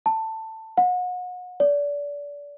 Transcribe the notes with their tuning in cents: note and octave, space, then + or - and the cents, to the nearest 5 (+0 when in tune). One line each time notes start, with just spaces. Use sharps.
A5 +15
F#5 -35
D5 -30